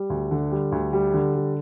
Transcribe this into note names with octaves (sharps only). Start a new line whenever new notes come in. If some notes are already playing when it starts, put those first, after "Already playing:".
Already playing: G3
D2
D3
G3
D2
G3
D3
G3